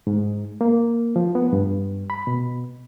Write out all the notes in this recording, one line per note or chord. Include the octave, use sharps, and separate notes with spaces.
G#2
A#3
F3
B3
G2
B5
B2